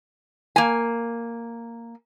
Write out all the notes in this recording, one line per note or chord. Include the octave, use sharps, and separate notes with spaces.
A#3 G#5